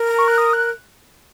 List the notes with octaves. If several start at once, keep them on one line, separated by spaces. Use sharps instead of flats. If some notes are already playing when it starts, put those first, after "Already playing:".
Already playing: A#4
A#5
C#6
F#6
D#6
F#6